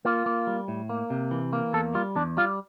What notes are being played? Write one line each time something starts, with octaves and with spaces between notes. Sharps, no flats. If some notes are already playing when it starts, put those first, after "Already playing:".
A#3 F4
A#3
G3
A2
A#3
C3
E3
A#3
E2 A4
G3 F4
E2 D4
G3 F4